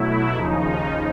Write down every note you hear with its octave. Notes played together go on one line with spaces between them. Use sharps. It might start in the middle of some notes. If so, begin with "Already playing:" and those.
Already playing: B2 F#3 A3 E4
D#2 C#3 F3 D#4